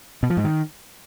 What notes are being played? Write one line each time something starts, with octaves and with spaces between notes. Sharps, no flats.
B2
F3
G#2
D#3